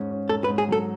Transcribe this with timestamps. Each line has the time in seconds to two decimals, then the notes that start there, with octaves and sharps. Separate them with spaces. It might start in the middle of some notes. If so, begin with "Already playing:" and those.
Already playing: G#2 C#4
0.11 C#4
0.29 G#2 A4
0.44 B4
0.48 G#2
0.58 G#4
0.68 F#3 A4